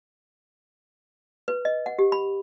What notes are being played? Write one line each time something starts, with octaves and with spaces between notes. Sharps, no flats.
B4
D#5
F#5
G4
B5